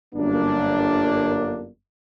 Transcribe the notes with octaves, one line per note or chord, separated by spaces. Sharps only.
G1 F#2 A#3 D4